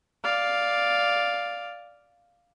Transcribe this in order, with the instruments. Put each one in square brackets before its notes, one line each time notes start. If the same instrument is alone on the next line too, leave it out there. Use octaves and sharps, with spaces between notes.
[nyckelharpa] D5 F5